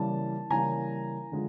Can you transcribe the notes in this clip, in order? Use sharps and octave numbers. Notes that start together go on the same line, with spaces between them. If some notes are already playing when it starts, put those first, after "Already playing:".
Already playing: C#3 E3 G3 A#3 A5
C#3 E3 G3 A#3 G#5 A#5
D3 F3 G#3